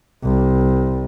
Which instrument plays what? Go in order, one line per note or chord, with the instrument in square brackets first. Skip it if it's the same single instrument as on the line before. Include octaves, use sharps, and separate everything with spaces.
[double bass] C2